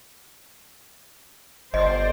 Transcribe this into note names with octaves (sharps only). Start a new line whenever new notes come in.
G1 C5 D5 D#5